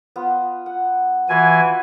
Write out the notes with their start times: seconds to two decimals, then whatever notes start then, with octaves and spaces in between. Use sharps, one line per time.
0.16 B3 F4
0.66 F#5
1.29 E3 F4 F#4 B4 G#5